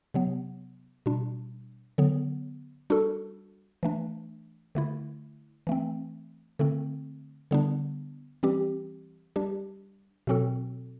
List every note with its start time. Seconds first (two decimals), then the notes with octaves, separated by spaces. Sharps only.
0.14 C3 F#3 B3
1.06 B2 G3 D4
1.98 D3 F#3 B3
2.90 G3 D4 F#4 A4
3.83 E3 A3 D4
4.75 D3 A3 E4
5.67 E3 A3 C4
6.59 D3 A3 C4
7.51 D3 G3 B3 D4
8.43 E3 G3 C4 G4
9.36 G3 D4 G4
10.27 B2 F#3 C4 F#4 A4